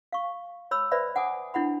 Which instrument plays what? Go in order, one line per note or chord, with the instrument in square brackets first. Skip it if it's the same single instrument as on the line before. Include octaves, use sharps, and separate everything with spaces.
[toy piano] F5 C#6
C#5 B5 E6
B4 C5 D5 E5 B5
F#5 G#5 D6 D#6
D4 E4 F#5 B5